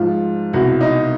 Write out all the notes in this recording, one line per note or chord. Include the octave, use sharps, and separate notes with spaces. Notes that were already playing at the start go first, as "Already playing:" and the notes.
Already playing: G#2 F3 F4
C2 B2 F#4
D#4